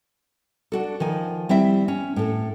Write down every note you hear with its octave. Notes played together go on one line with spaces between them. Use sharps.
D4 F#4 A4
D#3 F3 G#5
G3 C4 E4 E5
C#4
A2 A4